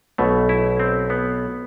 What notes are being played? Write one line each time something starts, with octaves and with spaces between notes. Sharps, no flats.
B1 B2 A3
E4
C4
B3